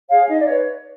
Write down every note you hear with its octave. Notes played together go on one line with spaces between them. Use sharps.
G#4 C#5 F5
D#4 D#5
D5
B4 C#5